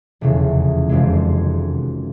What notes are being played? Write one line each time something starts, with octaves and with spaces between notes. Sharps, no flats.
F1 E2 C#3
F#1 F2 C3 D#3 G#3